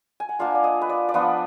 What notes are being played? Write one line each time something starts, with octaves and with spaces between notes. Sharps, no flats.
G#5
F#5
A#3 D4 F4 F5
D5
D#5
B4
D5
D5
F3 B3 D4 F4 B4